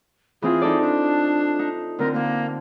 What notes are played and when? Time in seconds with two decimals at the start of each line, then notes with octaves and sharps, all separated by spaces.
0.42 E3 C4 F4 G#4
0.61 D#4 A4 D5
0.82 D4
1.59 D#4
1.99 D3 C4 A#4
2.14 A#3